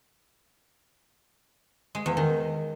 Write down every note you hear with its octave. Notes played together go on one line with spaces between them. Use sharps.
G#3
E2
D#3